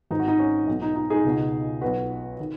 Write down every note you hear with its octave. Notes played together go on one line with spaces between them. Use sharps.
G#1 G#2 D#3 D#4
F#4
D#4
C#4
B1 B2
D#4
D#4
D#4 G#4
C#2 B2
B1 B2 F#4 B4
D#3